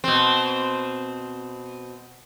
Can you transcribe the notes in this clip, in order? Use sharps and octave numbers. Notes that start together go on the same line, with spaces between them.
B2 C4